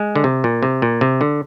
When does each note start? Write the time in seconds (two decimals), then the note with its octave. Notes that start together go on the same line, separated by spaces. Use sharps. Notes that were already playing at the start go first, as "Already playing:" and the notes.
Already playing: G#3
0.16 D3
0.24 C3
0.44 A#2
0.63 C3
0.82 A#2
1.01 C3
1.21 D3